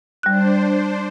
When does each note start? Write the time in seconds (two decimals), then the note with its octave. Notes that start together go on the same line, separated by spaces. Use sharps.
0.23 G3 D4 C5 F#6